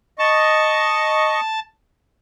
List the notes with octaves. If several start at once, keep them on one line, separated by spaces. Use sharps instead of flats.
D#5 A5 C#6